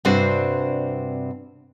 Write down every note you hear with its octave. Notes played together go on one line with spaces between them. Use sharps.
G2 C3 C4 D4 F#4 C5